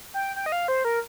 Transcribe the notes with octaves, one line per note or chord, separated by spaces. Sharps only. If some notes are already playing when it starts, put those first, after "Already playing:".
G5
G5
D#5
F5
C5
A#4